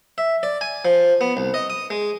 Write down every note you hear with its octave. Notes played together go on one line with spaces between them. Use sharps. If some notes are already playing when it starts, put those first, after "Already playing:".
E5
D5
G#5
F3
B3
C2
D#5
D#6
G#3